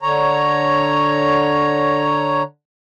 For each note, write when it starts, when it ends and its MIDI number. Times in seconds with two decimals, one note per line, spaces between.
0.02 2.42 50
0.02 2.42 73
0.02 2.42 82